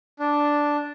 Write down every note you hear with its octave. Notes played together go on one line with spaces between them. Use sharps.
D4